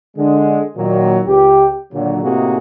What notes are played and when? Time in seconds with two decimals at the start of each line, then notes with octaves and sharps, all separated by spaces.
0.16 D3 G#3
0.76 A#2 D#3 F#3
1.26 C#2 G4
1.93 A#2 D3 D#3 F#3
2.24 A2 C3 A#3 D#4 F#4 G#4